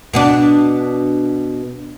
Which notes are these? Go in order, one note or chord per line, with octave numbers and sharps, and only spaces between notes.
B2 B3 D4